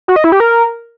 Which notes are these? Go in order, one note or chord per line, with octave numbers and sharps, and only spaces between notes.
F#4
D#5
E4
G4
A#4